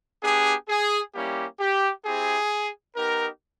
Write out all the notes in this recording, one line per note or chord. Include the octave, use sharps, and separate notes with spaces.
B3 D4 G4 G#4
G#4
G3 A#3 C#4 E4 G4
G4
C4 E4 G4 G#4
B3 D#4 G4 A#4